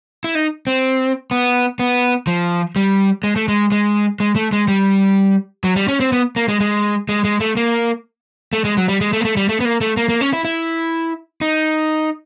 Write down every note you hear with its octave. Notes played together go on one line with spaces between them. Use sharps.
E4
D#4
C4
B3
B3
F3
G3
G#3
A3
G#3
G#3
G#3
A3
G#3
G3
F#3
G3
C#4
C4
B3
A#3
G#3
G#3
G#3
G#3
A3
A#3
A3
G#3
F#3
G3
G#3
A3
A#3
A3
G3
A3
B3
A#3
A3
A#3
A#3
C#4
E4
E4
D#4